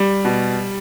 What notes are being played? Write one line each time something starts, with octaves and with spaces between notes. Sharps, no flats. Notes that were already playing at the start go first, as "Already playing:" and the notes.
Already playing: G3
B2